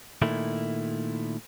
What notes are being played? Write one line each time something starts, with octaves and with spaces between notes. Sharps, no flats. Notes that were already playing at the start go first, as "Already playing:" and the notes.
A#2 D#3 A3 E4